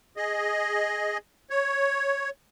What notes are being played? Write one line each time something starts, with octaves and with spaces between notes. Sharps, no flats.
G#4 D#5
C#5